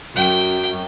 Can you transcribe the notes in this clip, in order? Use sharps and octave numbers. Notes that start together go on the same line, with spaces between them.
F#2 G5